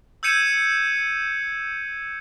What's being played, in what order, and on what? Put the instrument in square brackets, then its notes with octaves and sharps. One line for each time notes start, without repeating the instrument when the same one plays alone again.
[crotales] E6 G6 G#6 C#7 D#7 E7